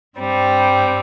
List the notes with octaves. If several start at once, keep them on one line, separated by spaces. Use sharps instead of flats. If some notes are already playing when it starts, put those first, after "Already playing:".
G2 G3 C4